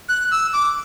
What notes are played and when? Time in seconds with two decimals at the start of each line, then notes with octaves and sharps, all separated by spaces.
0.09 F#6
0.31 E6
0.53 D6